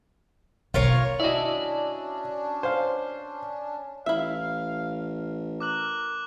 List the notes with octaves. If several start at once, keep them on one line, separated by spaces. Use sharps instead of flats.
B1 D3 F4 A#4 C#5
C#4 D4 E4 F#4 D5 D#5
C5 F5
A1 E4 E5 F5
A#4 D6 F#6 F#7